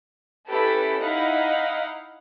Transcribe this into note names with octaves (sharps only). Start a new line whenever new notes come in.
C#4 E4 G4 A4 B4
D#4 E4 F5 F#5